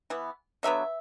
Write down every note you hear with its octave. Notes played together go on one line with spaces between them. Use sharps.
E3 B3
D3 F#3 B3 E5